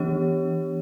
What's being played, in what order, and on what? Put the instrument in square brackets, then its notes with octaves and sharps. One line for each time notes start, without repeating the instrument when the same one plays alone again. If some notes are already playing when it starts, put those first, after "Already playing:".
Already playing: [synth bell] E3 B3 D4 G4 C#5